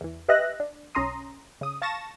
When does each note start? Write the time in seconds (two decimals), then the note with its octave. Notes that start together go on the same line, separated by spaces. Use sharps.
0.01 E2 E3
0.28 G4 B4 D#5 E5 F#6 A#6
0.60 D4
0.95 B1 C#4 A#5 C6 D#6
1.61 C#3 D#6
1.82 F5 A5 C#6 A6 A#6 E7